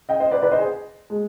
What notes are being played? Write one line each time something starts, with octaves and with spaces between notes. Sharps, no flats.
D#5 G5
C5 D#5
B4 D5
B4 D5
C5 D#5
G#4
G#3